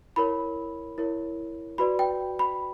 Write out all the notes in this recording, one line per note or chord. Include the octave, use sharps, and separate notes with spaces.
E4 A#4 C#5 B5
E4 A#4 C#5
F#4 B4 D5 B5
G5
B5